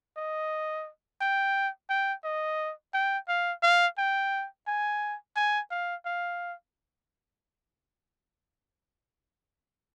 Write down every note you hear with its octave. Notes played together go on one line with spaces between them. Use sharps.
D#5
G5
G5
D#5
G5
F5
F5
G5
G#5
G#5
F5
F5